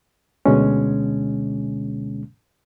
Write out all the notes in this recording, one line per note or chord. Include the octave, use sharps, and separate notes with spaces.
D2 B2 D3 G#3 C#4